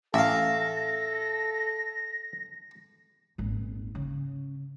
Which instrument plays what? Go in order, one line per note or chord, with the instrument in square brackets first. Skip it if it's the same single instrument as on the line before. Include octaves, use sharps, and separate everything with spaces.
[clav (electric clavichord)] A1 [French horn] A4 [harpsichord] E5 F5 [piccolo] A#6
[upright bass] D#1 G#1
C#3